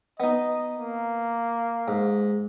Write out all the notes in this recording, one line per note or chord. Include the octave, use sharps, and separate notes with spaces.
B3 D#4 D#5
A#3
G#2